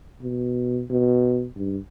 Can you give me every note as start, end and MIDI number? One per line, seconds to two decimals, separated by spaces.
0.22 0.83 47
0.90 1.47 47
1.57 1.78 43